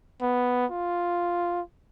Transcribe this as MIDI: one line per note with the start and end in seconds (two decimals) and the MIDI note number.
0.22 0.66 59
0.71 1.61 65